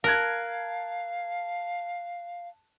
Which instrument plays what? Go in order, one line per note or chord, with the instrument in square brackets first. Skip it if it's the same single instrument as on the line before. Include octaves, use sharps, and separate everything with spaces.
[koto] A#4 [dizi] F5 [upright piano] A5 F#6 G#6